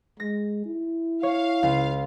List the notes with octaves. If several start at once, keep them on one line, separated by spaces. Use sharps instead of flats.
G#3 A#6
E4
C#5 F5
C#2